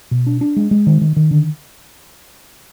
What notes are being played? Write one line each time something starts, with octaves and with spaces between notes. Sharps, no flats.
B2
D4
D4
G#3
G#3
D#3
D#3
D#3
D3